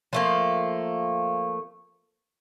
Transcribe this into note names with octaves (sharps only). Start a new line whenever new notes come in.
F3 A3 A#3